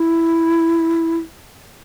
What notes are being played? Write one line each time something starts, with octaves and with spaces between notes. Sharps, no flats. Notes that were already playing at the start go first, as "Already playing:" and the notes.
Already playing: E4